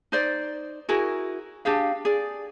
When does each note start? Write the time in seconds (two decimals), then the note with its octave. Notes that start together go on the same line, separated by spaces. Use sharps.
0.12 D#4 C5 D5
0.89 E4 F#4 G#4 A#4
1.65 D4 G4 G#4 F5
2.05 G#4 D5